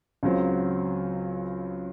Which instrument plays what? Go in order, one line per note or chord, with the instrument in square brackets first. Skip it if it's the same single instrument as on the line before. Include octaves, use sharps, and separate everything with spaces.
[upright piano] C#2 C#3 F#3 C4